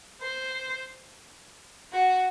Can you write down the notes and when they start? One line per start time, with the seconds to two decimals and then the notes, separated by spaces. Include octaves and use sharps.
0.22 C5
1.93 F#4